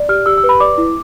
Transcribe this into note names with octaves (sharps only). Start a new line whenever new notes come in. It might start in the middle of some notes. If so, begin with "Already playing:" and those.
Already playing: D5
G4 F6
G4 E6
E6
B4
B5
D5 D6
E4